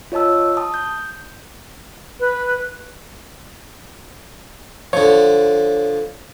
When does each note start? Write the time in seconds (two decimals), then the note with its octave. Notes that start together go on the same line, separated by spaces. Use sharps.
0.12 F4 C#5 D#5 A5 E6
0.57 A5 D#6
0.74 G6
2.19 B4
4.93 D3 F3 C#5